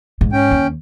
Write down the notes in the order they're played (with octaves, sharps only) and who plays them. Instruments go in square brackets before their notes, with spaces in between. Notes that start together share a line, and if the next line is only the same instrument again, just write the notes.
[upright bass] G#2
[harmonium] C#4 G5
[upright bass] D#2